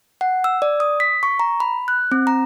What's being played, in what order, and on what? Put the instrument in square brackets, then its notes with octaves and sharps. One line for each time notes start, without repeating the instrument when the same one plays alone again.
[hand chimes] F#5
E6
D5
D#6
B6
C#6
A#5
B5
F#6
C4
A#5